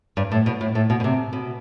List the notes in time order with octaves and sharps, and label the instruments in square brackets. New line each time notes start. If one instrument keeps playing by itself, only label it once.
[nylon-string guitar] G2
A2
B2
A2
A2
B2
B2
C3
B2